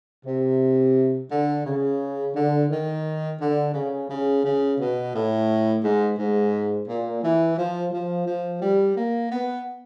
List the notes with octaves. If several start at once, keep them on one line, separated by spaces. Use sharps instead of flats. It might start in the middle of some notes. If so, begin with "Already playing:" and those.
C3
D3
C#3
D3
D#3
D3
C#3
C#3
C#3
B2
A2
G#2
G#2
A#2
E3
F3
F3
F3
G3
A#3
B3